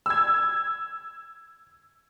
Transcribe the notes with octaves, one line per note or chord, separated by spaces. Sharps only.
E6 G#6